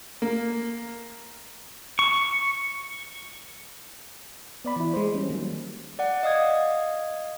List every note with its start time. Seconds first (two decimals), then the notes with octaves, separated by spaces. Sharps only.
0.22 A#3
1.99 C#6
4.65 B3 D5 B5
4.76 E3 E4
4.94 G#3 C5
5.14 G3 C#4
5.28 D#3 F#3 A#3
5.99 D5 F#5
6.23 D#5 F5 D#6 G#6